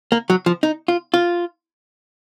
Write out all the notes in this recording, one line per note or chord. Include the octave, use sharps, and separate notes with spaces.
A#3
F#3
F3
D#4
F4
F4